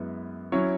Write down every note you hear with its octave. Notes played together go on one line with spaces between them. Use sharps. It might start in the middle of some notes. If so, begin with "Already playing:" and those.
Already playing: F#2 G#3 B3 E4
F#3 C#4 E4 C#5